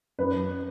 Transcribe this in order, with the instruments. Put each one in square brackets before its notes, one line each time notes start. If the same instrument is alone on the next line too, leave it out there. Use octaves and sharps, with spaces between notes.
[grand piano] F#2 B4